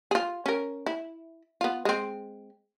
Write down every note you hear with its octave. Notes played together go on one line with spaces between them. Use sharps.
F4 G#4
C#4 A#4
E4
B3 F4
G#3 C4